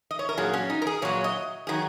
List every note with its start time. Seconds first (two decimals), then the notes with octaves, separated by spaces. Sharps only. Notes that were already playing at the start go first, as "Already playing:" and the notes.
0.11 D#5
0.19 C#5
0.29 A#4
0.38 A#2 F#3 G#4
0.53 C#4
0.70 D#4
0.82 A#4
0.87 G#4
1.02 A#2 F#3 C#5
1.24 D#5
1.67 D#3 F#3 G#4